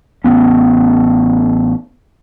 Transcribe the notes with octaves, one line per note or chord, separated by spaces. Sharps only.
A1 F#3 B3 C#4